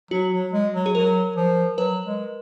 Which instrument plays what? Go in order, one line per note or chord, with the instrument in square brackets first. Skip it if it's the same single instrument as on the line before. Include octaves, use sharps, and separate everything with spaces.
[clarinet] F#3 [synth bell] F#4
[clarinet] F#3
G#3
F#3
[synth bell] G#4
[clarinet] F#3 [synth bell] A#4
[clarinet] F3
[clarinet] F#3 [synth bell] B4
[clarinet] G#3